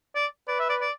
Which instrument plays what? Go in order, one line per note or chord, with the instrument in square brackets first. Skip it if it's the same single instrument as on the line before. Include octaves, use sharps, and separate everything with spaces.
[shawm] D5
[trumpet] B4 [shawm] D5
[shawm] E5
D5
D5